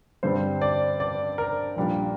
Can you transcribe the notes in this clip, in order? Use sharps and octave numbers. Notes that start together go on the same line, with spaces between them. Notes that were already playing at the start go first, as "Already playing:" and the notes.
G2 D3 G3 C4 C5
D5
D5
A#4
A#1 A#2 G3 D4